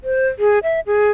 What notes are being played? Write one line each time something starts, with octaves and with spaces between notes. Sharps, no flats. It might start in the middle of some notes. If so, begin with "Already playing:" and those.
C5
G#4
E5
G#4